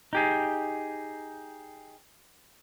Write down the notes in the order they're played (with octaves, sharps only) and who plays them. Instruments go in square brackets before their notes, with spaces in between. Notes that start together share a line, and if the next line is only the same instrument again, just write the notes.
[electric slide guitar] D#4 G4 G#4